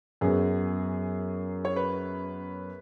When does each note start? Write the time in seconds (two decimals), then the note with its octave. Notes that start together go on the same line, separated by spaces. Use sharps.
0.21 F#2 F#3 B3 G#4
1.65 C#5
1.76 B4